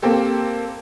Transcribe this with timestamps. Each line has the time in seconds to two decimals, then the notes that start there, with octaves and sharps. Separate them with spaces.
0.02 A#3 C4 G4 A4